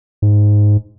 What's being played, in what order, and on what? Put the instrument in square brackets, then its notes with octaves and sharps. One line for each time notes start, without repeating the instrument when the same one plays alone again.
[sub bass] G#2